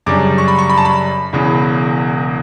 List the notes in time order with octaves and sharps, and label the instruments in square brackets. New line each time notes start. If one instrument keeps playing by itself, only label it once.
[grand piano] F#2 C#3 G3 D4 D6
C#6
B5
C#6
B5
A5
B5
E1 E2 C#3